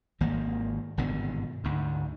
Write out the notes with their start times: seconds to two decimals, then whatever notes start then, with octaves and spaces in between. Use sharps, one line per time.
0.21 G#1 D#3 A#3
0.98 G#1 G2 B2 D3
1.64 D2 G#2